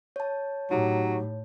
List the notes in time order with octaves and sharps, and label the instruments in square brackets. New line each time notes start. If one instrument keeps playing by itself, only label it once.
[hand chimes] C#5 A5
[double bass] A2 [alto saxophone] F#3 [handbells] D#4 G4